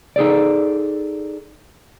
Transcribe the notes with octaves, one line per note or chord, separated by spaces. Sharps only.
D#4 G#4 A4 D5